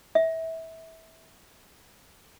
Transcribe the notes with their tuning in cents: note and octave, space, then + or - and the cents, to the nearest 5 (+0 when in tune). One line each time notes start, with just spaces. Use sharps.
E5 -20